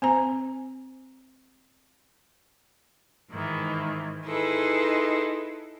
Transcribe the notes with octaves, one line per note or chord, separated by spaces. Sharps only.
C4 C5 A#5
G#2 D#3 E3
D#4 E4 G#4 A4 B4 C5